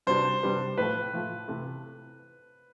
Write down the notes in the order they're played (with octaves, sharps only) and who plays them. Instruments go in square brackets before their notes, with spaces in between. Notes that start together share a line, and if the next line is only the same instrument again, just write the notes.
[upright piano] C3 G3 D4 G4 B4 [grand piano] C5
[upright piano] C3 G3 D4 G4 B4
[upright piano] A2 F3 A3 [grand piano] B4
[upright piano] A2 F3 A3
C3 E3 A3